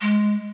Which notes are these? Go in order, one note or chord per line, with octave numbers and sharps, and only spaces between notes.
G#3